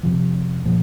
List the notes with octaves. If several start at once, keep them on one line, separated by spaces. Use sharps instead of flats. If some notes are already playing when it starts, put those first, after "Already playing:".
F2 C3 F3
A#2 F3 A#3